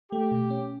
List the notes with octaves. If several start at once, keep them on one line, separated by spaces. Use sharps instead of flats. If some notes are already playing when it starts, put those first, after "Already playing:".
A3 G4
B2
C#4